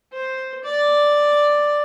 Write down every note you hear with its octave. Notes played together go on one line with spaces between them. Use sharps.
C5
D5